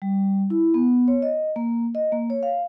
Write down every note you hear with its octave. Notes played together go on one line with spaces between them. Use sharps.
G3
E4
B3
C#5
D#5
A#3
D#5
A#3
C#5
F5